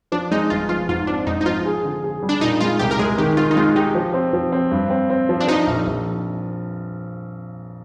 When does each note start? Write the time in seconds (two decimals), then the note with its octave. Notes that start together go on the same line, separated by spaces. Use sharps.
0.12 F3 D4
0.31 G#3 D#4
0.50 G1 F4
0.69 F3 F4
0.89 G#2 F4
1.07 C4 D4
1.27 G#2 D#4
1.41 D#4
1.46 F3 F4
1.65 G#4
1.84 D3
2.04 G#4
2.23 G3
2.29 D4
2.41 A#2 D#4
2.60 G#3 F4
2.79 C2 G4
2.91 A#4
2.99 G#3 G#4
3.18 D#3 G4
3.37 D#3 F4
3.51 D#4
3.56 G#3 F4
3.76 D#4 G4
3.95 F3
4.14 C4
4.33 F3
4.52 C4
4.71 G2
4.90 C4
5.10 C4
5.29 F3
5.40 D4
5.48 F3 D#4
5.67 A#1
5.87 A#1